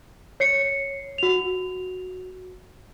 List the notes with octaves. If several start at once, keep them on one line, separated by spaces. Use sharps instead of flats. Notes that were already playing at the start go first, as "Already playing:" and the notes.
C#5 C7 C#7
F#4 F7